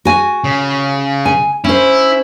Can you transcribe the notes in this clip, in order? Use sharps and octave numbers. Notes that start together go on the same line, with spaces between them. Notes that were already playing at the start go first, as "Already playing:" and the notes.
F#4 G#5
C#3
G#5
C#4 E4 C5